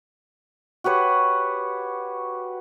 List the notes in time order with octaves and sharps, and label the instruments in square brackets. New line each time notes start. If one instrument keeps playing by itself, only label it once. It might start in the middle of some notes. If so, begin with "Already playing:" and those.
[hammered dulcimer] F#4 G4 B4 C#5